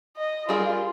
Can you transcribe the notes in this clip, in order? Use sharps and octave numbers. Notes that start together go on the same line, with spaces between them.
D#5
G3 F4 G#4 A#4